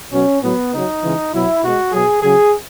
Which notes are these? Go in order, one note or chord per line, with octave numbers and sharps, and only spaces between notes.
B2 F#3 C#4
A2 F#3 B3
C#3 F#3 D#4
C#3 E3 G#3
B2 F#3 E4
B2 G#3 F#4
B2 F#3 G#4
C#3 F#3 G#4